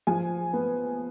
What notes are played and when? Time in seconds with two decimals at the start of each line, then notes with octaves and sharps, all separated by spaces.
0.07 F3 G#5
0.53 B3